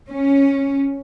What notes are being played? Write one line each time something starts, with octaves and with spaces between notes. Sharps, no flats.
C#4